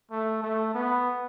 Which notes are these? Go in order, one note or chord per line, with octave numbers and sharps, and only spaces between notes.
A3
A3
B3